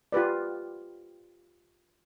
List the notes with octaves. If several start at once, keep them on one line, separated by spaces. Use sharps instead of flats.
F4 G4 B4 D5